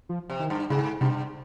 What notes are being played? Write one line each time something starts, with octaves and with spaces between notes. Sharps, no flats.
F3
C3
D#3
G2
G#2 C#3
G2 C3